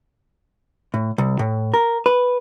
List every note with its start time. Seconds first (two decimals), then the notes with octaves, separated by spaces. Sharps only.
0.94 A2
1.18 C2
1.39 A2
1.74 A#4
2.06 B4